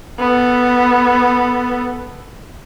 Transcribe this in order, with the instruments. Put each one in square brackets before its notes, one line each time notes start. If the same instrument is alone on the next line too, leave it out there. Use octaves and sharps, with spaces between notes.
[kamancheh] B3 A4